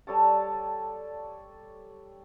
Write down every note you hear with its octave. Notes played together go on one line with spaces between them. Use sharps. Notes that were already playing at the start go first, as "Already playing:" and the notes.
G3 A4 C#5 A5